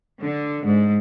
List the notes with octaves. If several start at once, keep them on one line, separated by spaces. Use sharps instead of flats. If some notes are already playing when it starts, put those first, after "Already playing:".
D3
G#2